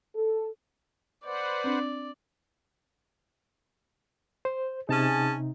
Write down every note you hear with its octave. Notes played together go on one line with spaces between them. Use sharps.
A4
B4 C5 D5 F#5
C4 D4
C5
C3 C#4 D#4 G#4 A5